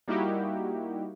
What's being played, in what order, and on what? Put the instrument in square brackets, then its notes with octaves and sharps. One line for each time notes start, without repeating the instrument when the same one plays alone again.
[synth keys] G3 A#3 D#4 E4 F#4 G4